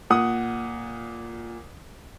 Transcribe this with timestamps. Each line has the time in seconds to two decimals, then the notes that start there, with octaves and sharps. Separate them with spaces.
0.10 A#2 F#5 D#6